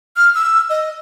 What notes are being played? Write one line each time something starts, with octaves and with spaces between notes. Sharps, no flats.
F6
E6
D#5